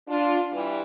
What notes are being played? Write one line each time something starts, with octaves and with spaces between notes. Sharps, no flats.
D4 F4
E3 G3